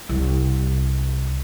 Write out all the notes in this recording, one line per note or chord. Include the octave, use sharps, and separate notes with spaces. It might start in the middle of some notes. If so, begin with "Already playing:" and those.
C2